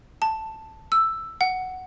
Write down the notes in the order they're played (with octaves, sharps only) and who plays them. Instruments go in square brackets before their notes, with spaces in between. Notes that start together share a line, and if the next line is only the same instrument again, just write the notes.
[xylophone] A5
E6
F#5